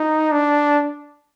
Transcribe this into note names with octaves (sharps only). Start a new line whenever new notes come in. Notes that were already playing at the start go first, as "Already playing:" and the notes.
Already playing: D#4
D4